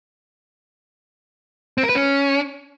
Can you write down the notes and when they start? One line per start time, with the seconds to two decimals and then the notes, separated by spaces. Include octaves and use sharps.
1.78 C4
1.83 A#4
1.89 B4
1.95 C#4